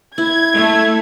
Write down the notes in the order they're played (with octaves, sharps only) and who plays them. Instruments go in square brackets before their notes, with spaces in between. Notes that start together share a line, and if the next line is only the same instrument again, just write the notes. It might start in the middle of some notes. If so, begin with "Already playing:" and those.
[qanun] E4 [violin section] G#6
[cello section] A3